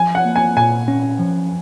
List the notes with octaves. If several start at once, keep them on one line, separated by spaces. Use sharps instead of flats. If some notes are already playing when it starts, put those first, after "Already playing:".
Already playing: F3 G#5
F#5
A#3
G#5
A#2 G#5
C#4
F3